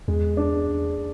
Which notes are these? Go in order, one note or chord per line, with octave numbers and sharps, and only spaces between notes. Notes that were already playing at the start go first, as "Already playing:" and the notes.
E2 G#3
D4